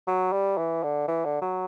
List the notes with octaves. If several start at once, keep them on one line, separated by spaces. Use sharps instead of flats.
F#3
G3
E3
D3
E3
D3
F#3